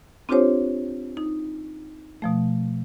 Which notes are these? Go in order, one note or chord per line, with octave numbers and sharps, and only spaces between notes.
C4 D4 F4 G4 C5 C#5
D#4
B2 F3 A3